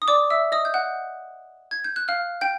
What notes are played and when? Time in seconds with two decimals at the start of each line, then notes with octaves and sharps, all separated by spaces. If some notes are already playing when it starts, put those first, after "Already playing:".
0.02 D#6
0.08 D5 D6
0.30 E5 E6
0.52 D#5 D#6
0.65 G6
0.74 F#5 F#6
1.71 G#6
1.84 G6
1.96 F#6
2.08 F5 F6
2.41 G5 G6